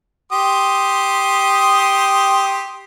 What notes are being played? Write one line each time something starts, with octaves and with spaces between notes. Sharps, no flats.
G4 C6 D#6